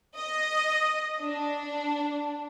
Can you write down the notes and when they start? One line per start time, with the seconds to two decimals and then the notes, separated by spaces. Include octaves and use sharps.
0.16 D#5
1.21 D4